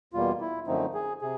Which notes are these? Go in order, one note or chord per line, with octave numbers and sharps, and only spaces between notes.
E2 B2 G3 A#3 F4
E4
F#2 D3 F3 A3 C4 D#4
G#4
C3 G#4